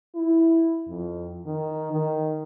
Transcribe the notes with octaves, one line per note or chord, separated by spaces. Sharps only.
E4
F2
D#3
D#3